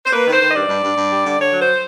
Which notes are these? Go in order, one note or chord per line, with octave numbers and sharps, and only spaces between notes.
C5
A#3 B4
D#3
C5
D#3
D#5
G2 D5
G2
G2
G2
G3
D3
D3 C#5
F#3
C5